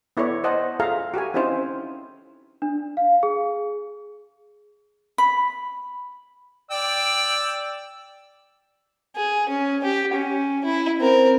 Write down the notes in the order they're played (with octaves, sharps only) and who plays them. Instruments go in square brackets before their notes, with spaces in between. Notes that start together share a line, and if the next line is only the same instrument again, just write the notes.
[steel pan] B3 E4 A4 C#5 D5
C5 D#5 F#5 A5
F4 G#4 A4 E5 F5 A#5
F#4 G4 A4 G#5
C4 C#4 D#4 E4 C5 F5
[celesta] D4
F5
G#4
[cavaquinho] B5
[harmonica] D5 G5 E6
[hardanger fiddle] G#4
C#4
G4
C#4
E4
C4 A#4